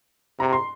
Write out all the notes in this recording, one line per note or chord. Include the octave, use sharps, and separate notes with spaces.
C3 A#5
C6